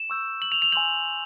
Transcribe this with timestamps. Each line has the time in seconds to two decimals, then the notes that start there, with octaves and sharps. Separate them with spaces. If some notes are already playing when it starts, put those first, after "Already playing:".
Already playing: E7
0.10 C#6 E6 G6
0.42 F#7
0.52 F7
0.62 F7
0.72 G#5 C6 E6 G6 F#7